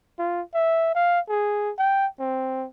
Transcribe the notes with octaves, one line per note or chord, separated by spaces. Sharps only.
F4
E5
F5
G#4
G5
C4